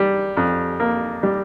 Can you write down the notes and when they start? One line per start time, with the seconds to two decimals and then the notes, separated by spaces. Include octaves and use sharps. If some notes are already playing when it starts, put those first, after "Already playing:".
Already playing: G3
0.37 F2
0.80 A#3
1.23 G3